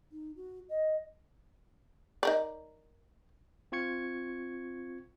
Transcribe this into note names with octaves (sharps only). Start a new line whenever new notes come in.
D#4
F#4
D#5
D#4 A#4 D5
C4 F4 C#6 G#6 C#7